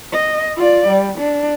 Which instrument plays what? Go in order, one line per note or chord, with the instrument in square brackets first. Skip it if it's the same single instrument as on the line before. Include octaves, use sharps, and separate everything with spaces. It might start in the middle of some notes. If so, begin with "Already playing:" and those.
[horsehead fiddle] D#5
F4 D5
G3
D4